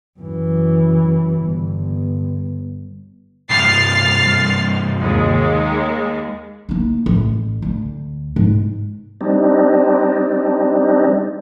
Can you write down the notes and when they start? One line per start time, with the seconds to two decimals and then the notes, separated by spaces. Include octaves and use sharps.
0.19 F#2 E3
1.42 G1
3.50 C2 G2 F6 A6 C7
4.99 D#2 G#3
6.69 A#3 D#4
7.06 A1
7.62 D2
8.36 G#2
9.21 G3 C4 D4 D#4